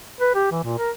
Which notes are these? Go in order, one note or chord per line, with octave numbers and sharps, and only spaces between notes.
B4
G4
E3
A#2
A#4